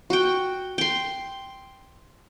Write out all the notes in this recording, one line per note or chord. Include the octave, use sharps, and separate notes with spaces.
F#4 G5
G5 C6